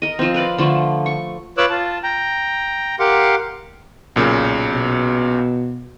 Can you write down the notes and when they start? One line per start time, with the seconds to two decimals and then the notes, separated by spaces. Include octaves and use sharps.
0.02 A#4 D#5
0.19 F3 C4
0.34 A#4 B4 D5 F5
0.58 D3 F3 A3
1.06 C#6
1.58 F4 B4 C#5 D6 E6 F#6
1.70 F4 A5
2.03 G5 A#5
2.99 G4 A#4 F5 F#5 C6 D6
4.16 B1 A#2 C#3
4.72 B2